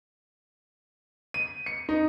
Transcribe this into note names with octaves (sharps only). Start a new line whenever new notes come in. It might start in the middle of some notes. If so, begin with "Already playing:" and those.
D#7
C#7
D#4